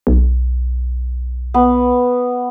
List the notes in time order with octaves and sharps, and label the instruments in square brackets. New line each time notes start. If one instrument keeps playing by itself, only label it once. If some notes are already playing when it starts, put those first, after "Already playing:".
[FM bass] B1
[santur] B3